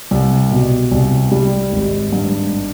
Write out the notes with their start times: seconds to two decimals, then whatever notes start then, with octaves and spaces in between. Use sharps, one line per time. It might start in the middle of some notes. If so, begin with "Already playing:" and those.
0.11 C2
0.51 B2
0.91 C2
1.32 G3
1.72 G#1
2.13 G2